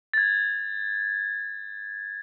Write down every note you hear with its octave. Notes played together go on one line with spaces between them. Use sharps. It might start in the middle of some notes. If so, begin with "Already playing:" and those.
G#6 A6